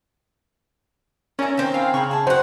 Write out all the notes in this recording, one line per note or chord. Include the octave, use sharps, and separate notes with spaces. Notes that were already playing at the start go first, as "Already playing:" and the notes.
C#4 A#4 D5 E5 A#5
D#3 C4
F5 G#5 B5
C#3 A#5 B5 C#6
G#4 E5 A5
F#3 F#4 C5 D#5 F#5 G5